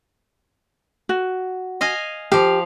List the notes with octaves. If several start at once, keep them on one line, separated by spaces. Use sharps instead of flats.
F#4
D#5 F5 G#5
F3 G4 F5